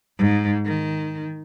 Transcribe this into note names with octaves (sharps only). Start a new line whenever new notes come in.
G#2
D#3